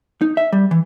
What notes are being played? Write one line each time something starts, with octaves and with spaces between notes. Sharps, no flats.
D#4
E5
G3
E3